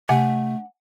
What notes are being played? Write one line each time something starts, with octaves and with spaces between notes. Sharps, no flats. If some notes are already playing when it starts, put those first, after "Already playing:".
C3 A3 D4 F#5 G#5